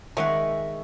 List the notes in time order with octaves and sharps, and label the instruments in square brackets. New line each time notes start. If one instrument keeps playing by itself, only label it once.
[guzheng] D#3 G#3 F#5 [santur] E5 C#6